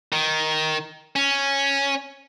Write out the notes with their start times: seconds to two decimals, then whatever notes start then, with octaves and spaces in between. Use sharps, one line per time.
0.13 D#3
1.16 C#4